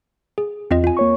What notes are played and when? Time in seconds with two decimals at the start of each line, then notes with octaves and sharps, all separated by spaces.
0.38 G#4
0.71 E2 C4 F4 D#5
0.84 F4 G#5
0.97 A#3 C#5 C#6